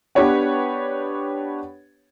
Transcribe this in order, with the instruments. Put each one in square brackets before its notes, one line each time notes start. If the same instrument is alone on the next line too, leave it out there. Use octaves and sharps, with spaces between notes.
[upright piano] B3 D4 G4 B4 C#5 F#5